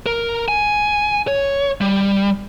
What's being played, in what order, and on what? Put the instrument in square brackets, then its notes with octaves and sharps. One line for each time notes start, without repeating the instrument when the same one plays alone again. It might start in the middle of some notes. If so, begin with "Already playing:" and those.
[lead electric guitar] A#4
G#5
C#5
G3